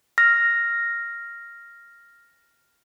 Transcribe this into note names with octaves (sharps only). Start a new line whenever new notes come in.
F6 A#6